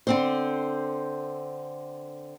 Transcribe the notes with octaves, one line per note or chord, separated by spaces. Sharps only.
D3 C4 C5